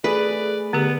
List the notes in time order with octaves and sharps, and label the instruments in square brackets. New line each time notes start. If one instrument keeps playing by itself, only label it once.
[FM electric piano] A3 G#4 [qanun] B4 [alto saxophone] D5
[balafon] D3 G4 [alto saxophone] B3